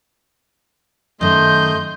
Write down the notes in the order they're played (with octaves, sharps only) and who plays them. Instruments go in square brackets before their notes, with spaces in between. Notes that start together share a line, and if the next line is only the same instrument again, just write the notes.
[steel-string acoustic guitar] F#2 D#3 [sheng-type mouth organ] A3 D#5 [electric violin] C6 G6